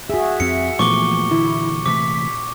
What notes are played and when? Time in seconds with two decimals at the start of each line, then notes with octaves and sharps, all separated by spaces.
0.10 F#4 G#4 E5
0.40 F2 C4 C#7
0.79 A#2 E3 F3 A3 B3 C#6 D6 G7
1.31 D3 E3 E4
1.86 C3 E3 A3 D6 B6